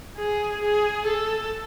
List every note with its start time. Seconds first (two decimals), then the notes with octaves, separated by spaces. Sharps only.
0.17 G#4
0.62 G#4
1.06 A4